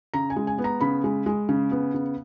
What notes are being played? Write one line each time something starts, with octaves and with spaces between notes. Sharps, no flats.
C#3 A#5
G#5
G#3
G#5
B3
A#5
C#3 B5
G#3
G#3
C#3
B3
C#3